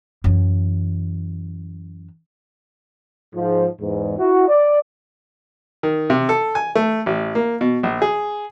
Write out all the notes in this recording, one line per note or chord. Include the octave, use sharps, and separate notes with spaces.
F#2 E3
G#2 F3
E2 G#2
E4 F#4
D5
D#3
C3
A4
G#5
A3
A1
A#3
B2
A#1
G#4